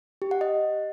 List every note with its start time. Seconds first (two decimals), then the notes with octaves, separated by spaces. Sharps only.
0.22 G4
0.31 F#5
0.41 D#5